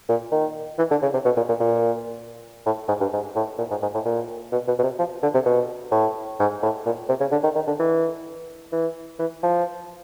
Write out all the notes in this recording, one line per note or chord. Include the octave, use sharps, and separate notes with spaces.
A#2
D#3
E3
D3
C#3
C3
B2
A#2
A#2
A#2
A2
G#2
G2
G#2
A2
A#2
G#2
G#2
A2
A#2
B2
B2
B2
C3
F3
D3
C3
B2
A2
G#2
A2
A#2
C3
C#3
D3
D#3
D#3
D3
E3
E3
E3
F3